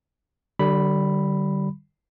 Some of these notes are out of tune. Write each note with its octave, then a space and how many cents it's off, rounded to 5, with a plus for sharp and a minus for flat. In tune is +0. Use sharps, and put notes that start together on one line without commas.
D3 +30 G3 -25 B5 +0